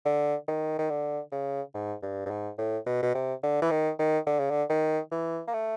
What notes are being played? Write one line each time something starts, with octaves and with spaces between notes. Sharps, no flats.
D3
D#3
D#3
D3
C#3
G#2
G2
G2
G#2
A2
B2
B2
C3
D3
E3
D#3
D#3
D3
C#3
D3
D#3
E3
A#3
A3